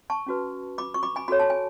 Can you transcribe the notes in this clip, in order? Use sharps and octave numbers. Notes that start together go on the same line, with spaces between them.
A5 C#6
C#4 F#4 B4
B5 D6
C#6
B5 D6
G#5 B5
F#4 A4 C#5 B5
A5
G#5